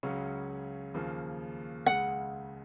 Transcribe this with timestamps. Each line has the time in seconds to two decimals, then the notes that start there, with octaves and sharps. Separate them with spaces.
0.03 C#2 C#3 F#3 C#4
0.94 D#2 C#3 F3 A#3
1.86 C#2 C#3 G#3 F#5